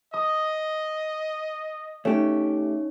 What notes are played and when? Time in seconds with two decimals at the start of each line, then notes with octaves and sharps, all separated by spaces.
0.14 D#5 D#6
2.05 A3 C#4 D#4 G4 C#5